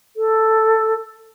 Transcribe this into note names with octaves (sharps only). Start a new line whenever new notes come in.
A4